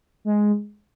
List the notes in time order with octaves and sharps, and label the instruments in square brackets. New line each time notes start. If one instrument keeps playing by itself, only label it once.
[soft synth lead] G#3